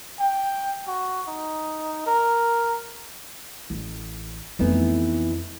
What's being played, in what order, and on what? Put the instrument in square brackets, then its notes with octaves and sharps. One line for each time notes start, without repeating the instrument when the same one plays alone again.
[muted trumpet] G5
F#4
D#4
A#4
[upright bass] A1
[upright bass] F2 A3 [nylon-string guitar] E3 B3 D#4